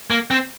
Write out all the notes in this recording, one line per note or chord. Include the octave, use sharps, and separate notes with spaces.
A#3
C4